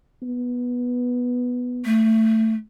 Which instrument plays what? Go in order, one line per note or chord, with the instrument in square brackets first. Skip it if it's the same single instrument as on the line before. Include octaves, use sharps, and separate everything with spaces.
[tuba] B3
[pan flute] A3